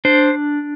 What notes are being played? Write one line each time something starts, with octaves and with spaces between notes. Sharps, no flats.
D4 C5